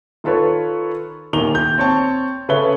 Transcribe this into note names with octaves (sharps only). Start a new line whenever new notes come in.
D#3 F4 A4 B4 C#5
D#1 D#2 D#3 F7 G7
G6
C4 C#5 A5
C#3 A4 B4 C#5 E5 G7